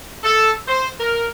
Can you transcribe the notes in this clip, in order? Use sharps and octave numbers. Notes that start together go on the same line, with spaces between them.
A4
C5
A#4